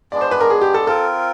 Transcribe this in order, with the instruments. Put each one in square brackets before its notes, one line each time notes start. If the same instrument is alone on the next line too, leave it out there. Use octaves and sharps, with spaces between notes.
[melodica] G#3 B3 D4 [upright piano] D5
[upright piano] C5
B4
A#4
G#4
G4
A4
[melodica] C4 F4 A#4 [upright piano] A4